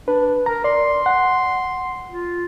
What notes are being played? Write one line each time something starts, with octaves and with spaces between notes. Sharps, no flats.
D4 B4
A#4 A#5
D5 C6
F#5
F4